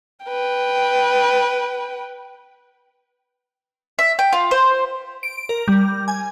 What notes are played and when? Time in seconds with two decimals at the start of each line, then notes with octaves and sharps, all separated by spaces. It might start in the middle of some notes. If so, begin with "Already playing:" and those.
0.25 B4 G5
3.99 E5
4.19 G5
4.33 F4
4.51 C5
5.23 D7
5.49 A#4
5.68 G3
6.08 G#5